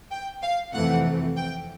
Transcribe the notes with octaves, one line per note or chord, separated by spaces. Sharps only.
G5
F5
F2 C3 E3 A3 F#5
G5